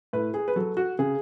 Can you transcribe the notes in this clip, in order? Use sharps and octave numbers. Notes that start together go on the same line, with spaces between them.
A2 B4
G#4
B4
F#3 A4
F#4
C#3 G#4